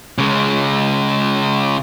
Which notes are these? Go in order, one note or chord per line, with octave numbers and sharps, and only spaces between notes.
C#3 G#3